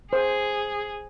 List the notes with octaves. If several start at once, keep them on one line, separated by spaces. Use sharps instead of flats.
G#4 C5